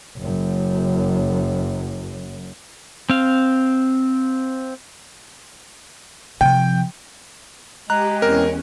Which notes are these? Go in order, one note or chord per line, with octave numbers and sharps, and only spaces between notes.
F#1 F#2
C4 F5
C3 F3 G5
G#3 G4 A#5 F#6
E2 C4 C#4 G4 A#4